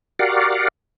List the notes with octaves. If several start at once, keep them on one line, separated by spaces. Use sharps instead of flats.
F#4 G4 A#4 D5 F5 F#5